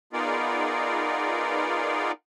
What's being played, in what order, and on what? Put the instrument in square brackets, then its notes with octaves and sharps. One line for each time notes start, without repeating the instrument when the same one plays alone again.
[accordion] B3 D#4 F4 G#4 A#4 D5